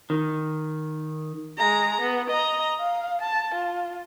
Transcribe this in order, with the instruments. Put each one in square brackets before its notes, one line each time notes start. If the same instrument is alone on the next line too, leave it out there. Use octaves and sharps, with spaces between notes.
[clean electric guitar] D#3
[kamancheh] G#3 A#5
B3
D#5 A#5
F5
A5
F4